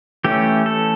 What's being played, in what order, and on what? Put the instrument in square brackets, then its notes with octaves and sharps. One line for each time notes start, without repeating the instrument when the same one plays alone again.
[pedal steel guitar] E3 A3 C#4 G4
A4